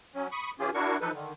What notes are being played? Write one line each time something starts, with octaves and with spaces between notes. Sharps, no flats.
F#3 C#4
B5 C#6 D#6
E3 C#4 F4 G4 G#4
D4 E4 F#4 A#4 C#6
E3 F3 D#4 A4 B4
D3 D#3